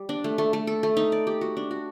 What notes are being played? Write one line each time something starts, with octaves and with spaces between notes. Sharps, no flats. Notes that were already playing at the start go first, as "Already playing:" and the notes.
Already playing: G3
D4
A3
A3
A3
A4
A3
D#4
D5
G4
F#4
D4
F#4